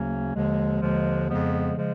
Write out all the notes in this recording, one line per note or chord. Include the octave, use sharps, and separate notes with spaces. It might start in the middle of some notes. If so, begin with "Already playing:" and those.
Already playing: D2 C#3 F#3 A#3 C#4
D#2 D3 F3 G#3
D#2 D3 F3 G#3
F2 C#3 F3 G#3 B3
C#3 F3 G#3